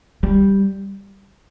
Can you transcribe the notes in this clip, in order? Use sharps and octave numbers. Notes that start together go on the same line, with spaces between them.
G3